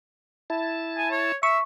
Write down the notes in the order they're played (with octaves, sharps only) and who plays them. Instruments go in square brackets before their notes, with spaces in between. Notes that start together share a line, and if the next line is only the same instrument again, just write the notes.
[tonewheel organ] E4 A5
[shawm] G#5
C#5
[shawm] E5 [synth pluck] C#6